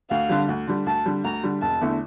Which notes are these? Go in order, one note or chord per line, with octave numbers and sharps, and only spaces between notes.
D2 F5
D3 G3
D2
D3 G3
D2 A5
D3 G3
D2 A#5
D3 G3
E1 A5
E2 D3 A3 E4